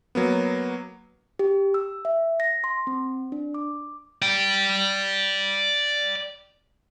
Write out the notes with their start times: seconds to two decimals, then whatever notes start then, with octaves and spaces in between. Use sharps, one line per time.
0.15 F#3 A#3 B3
1.39 G4
1.74 E6
2.05 E5
2.40 A#6
2.64 C6
2.87 C4
3.32 D4
3.54 D6
4.22 D5 G5